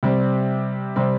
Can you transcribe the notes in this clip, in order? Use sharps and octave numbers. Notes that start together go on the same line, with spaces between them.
C3 G3 C4
C3 G3 C4